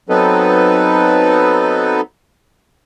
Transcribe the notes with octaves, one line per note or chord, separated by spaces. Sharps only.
F#3 B3 C4 D#4 A4 B4